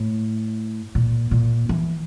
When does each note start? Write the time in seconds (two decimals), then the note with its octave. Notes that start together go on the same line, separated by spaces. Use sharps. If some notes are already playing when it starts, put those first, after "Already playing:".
Already playing: A2
0.95 A#2
1.31 A#2
1.69 E3